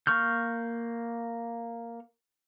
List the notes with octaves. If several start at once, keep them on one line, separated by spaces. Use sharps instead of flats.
A#3 C#6 F6 G6